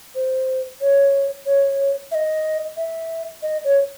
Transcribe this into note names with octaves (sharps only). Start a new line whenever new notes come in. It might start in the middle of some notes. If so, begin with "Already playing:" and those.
C5
C#5
C#5
E5
D#5
E5
D#5
C#5